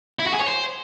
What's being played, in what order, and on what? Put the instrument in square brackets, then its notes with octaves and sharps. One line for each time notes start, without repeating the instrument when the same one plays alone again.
[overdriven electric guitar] E4
F#4
G#4
C#5
C5